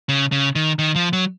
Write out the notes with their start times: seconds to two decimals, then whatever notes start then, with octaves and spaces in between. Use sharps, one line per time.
0.09 C#3
0.32 C#3
0.55 D#3
0.79 D#3
0.96 F3
1.13 F#3